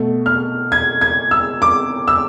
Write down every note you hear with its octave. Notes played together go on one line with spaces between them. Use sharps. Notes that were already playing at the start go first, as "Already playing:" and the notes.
Already playing: B2 A3
F6
G#6
G#6
E6
D6
E6